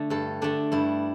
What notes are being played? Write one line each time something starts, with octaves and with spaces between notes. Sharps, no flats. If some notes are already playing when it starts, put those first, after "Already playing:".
Already playing: D3 A3
G2 A4
D3 A3 D4
G2 E4